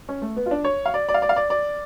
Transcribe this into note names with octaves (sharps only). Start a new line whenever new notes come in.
C#4
A3
B3
F4
D4
C#5
F5
D5
D5
F5
D5
F5
D5
D5